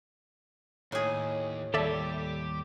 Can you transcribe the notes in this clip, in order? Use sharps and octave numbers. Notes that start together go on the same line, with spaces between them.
D#2 A2 G#4
D#2 G3 G4 A4 D5 E5